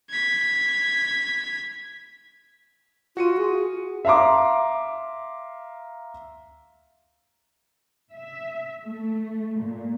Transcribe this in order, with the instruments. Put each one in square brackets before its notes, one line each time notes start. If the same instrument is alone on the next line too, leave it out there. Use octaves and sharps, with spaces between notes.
[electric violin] G#6 B6
[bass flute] F4 [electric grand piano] F#4 C#7 D#7
[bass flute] G#4
[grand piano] E5 F5 A#5 C6 D6
[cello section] E5
A3
A#2